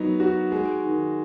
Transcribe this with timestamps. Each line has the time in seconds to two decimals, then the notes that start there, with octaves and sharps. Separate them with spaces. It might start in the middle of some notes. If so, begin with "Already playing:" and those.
Already playing: F#3 B3 D#4
0.20 F#4
0.52 G#3
0.85 D#3